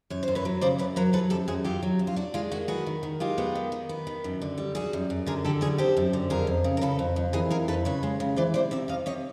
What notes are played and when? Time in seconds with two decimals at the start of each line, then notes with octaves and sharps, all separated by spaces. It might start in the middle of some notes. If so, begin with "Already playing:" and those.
0.10 F#2 C#5
0.23 C5
0.28 F#2
0.35 B4 C#5
0.45 F#3
0.61 C#3 C5 D5
0.78 F#2 B4 C#5
0.96 F#3 A#4 C5
1.13 F#3 A4 B4
1.30 F#2 G4 A4
1.48 F#2 F#4 G#4
1.64 F#3 F4 G4
1.83 F#3
1.99 F#2
2.07 F4
2.16 D4 F#4
2.34 G#3 F4
2.51 D#3 F#4
2.68 B3 F#4 G#4
2.86 D#3
3.03 D#3
3.20 G#3 F4 G4
3.38 B3
3.55 D#3
3.72 D#3
3.89 B3
4.07 D#3
4.24 F#2
4.41 D3
4.58 G3
4.75 G3 F#4 G#4
4.93 F#2
5.10 F#2
5.26 D3 G#4 A#4
5.44 D3 G4 A4
5.61 G3 F#4 G#4
5.78 C4 G4 A4
5.97 F#2
6.13 D3
6.30 F2 G#4 A#4
6.47 F2
6.64 C#3
6.77 A#4
6.81 C#3 A4 B4
6.99 F2
7.16 F2
7.33 E3 G#4 A#4
7.50 F2 G#4 A#4
7.68 F2 A4 B4
7.85 C#3 B4 C#5
8.03 G#3
8.20 C#3
8.36 E3 C5 D5
8.54 C3 C5 D5
8.71 C3 D5 E5
8.88 C3 D#5 F5
9.06 C3 C#5 D#5